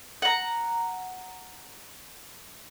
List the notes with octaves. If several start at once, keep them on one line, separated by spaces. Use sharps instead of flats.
F#5 A#5